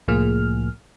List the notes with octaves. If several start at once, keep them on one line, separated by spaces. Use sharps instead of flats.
C2 A2 F3 A#3 G#4 F6